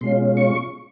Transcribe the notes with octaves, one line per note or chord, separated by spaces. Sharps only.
B2 G#3 C#4 F4 C6
C#6